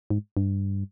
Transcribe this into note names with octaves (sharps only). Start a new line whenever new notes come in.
G#2
G2